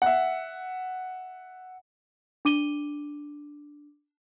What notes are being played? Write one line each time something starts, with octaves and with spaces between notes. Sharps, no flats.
E5 F#5
D4 D6 D#7 G7